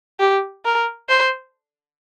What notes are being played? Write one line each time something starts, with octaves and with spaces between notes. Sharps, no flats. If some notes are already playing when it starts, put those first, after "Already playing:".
G4
A#4
C5